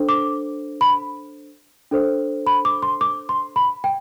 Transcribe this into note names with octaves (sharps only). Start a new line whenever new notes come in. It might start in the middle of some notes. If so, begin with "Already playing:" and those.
Already playing: D4 A4 C5
D6
B5
D4 A4 C5
B5
D6
C6
D6
C6
B5
G5